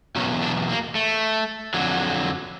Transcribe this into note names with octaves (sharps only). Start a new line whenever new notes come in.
E2 B2 F#3 C#4
D4
A#3
A3
F2 D3 F#3